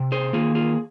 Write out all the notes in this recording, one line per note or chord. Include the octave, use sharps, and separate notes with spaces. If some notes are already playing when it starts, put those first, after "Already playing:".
Already playing: C3
G#4 C5
D#3 A#3 F4 G#4
F4 G#4